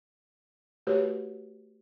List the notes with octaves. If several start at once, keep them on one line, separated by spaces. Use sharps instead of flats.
A3 F#4 G4 B4 C#5